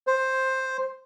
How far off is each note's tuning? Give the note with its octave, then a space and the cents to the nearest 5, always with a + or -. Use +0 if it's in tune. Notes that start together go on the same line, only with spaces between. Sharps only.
C5 +5